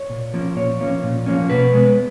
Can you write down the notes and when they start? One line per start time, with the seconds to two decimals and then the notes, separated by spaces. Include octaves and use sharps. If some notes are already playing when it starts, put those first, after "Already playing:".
Already playing: C#5
0.09 A#2
0.34 F3 A#3 C#4
0.56 A#2 C#5
0.80 F3 A#3 C#4
1.03 A#2
1.26 F3 A#3 C#4
1.49 B2 B4
1.73 G#3 B3